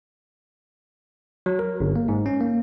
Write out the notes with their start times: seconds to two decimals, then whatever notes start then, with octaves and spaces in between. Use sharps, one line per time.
1.46 F#3
1.59 A#4
1.80 G1
1.96 A#3
2.08 G#2
2.26 C#4
2.41 A#3